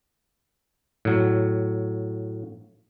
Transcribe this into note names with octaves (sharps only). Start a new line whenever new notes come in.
A2 F#3